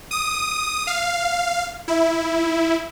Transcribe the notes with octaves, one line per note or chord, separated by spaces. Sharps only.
D#6
F5
E4